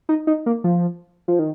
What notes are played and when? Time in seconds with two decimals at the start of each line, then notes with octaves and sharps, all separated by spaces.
0.09 D#4
0.27 D#4
0.46 A#3
0.64 F3
1.28 F3
1.39 D#3